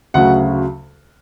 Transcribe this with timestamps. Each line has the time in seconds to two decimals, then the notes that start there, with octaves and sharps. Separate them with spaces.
0.14 D2 C#3 F#3 F#5